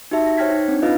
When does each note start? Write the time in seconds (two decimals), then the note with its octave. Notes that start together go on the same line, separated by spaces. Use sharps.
0.11 D#4 F#4 G4 E5 A5
0.26 A#6
0.37 C5 C#5 G5 F6 G#6 B6
0.51 D#4
0.68 C4 D4
0.82 D#4 F4 B4 D#5 F5